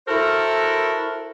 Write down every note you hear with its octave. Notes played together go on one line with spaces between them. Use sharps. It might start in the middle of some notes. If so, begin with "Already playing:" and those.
E4 F#4 A4 A#4 C5